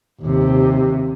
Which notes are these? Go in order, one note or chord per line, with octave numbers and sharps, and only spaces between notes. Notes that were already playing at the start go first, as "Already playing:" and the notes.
D#2 C3